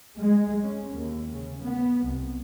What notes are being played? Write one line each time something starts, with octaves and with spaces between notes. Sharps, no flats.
G#3
C#4
D#2
C#3
B3
C2